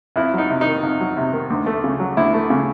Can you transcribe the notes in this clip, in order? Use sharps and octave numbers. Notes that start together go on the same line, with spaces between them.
F2 E4
F#3 D#4
C3
D#4
D#3
F2
F#3
C3
D#3
D2
A3
C#3
F#3
D2 E4
A3
C#3